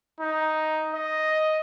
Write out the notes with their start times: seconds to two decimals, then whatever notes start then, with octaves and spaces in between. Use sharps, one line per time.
0.20 D#4
0.94 D#5